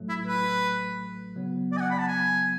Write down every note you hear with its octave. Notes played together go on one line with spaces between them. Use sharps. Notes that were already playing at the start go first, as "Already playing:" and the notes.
Already playing: A1 A2 F#3 A3
E4
B4
C#3 F#3 B3
D5
G#5
F#5
B5
A5
G#5